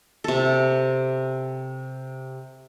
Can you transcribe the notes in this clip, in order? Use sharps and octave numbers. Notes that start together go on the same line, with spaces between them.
C3 A4